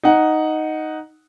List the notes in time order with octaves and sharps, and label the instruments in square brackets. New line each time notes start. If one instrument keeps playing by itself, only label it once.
[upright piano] D#4 F#5